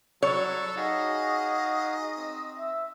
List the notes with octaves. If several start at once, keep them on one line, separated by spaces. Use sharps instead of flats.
F#3 G3 A4 C#5
D#4 F#4 G#4 D#5 F5
C4
E5